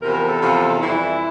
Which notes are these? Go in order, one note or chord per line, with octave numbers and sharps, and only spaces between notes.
E2 C3 F3 A#4
A#4
A4
E2 C3 F3
F2 E3 G3 E4